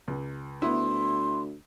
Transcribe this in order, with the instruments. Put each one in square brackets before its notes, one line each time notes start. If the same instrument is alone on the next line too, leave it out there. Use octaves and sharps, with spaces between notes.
[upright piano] C#2
[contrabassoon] D2 [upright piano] B3 E4 [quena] C6